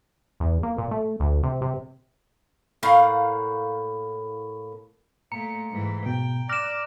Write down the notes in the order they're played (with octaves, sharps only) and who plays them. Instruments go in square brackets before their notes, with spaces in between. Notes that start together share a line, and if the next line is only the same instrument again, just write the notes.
[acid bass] E2
A#3
A#2
A3
D2
C3
C3
[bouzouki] A2 A#3 F5 F#5
[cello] A#2 A3 [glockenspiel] A#5 [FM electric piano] C#7
[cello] G#2 E3
[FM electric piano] B2 [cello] G5
[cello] D5 [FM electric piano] D6 F6 F#6 [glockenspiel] A#6 E7